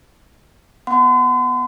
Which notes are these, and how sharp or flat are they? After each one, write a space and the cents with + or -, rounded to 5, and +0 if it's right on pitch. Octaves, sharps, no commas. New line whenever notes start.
B3 +0 F#5 +0 C6 -45